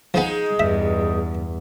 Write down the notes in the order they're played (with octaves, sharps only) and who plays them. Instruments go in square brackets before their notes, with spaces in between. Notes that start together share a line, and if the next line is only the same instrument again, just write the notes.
[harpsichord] F3 B3 [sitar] G#3 D#4 G#4
[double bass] E2 [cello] G2 [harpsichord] E5